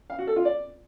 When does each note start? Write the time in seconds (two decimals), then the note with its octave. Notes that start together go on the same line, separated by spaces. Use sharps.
0.10 F5
0.19 F#4
0.27 A4
0.36 F4
0.45 D5